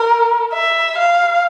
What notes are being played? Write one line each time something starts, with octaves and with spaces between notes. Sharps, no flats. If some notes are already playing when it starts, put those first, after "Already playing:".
Already playing: A#4
E5
F5